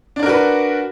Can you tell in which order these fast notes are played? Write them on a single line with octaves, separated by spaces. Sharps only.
D4 D5 A#4 F#4 B4